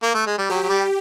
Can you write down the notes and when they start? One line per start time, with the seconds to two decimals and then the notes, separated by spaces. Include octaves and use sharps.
0.03 A#3
0.14 A3
0.26 G#3
0.38 G3
0.50 F#3 G4
0.63 F#3
0.69 G3